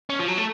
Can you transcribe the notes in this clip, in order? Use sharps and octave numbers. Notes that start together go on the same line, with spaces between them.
C#4
F3
F#3
A3